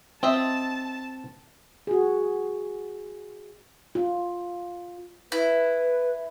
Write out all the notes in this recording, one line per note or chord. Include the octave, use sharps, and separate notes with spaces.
C4 F4 D#5 E5 A5
F#4 G#4
F4
E4 B4